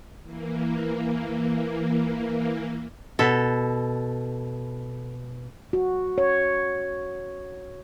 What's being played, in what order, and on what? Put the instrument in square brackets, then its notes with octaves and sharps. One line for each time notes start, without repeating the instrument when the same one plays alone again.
[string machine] E3 A#3
[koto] B2 A4
[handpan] F#4
C#5